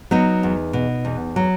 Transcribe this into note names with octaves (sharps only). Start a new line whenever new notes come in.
F#3 B3 D#4
E2
B2
E2
F#3